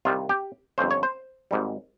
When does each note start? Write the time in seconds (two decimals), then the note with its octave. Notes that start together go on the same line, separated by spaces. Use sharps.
0.05 C2 C3 D#3 G3 F4
0.29 G4
0.78 G1 F2 C#3 C5
0.91 C#5
1.03 C5
1.51 G#1 G#2 G3